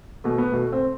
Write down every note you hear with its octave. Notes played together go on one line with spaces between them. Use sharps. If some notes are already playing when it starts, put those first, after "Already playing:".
B2 A3
B3
B2 A3
C4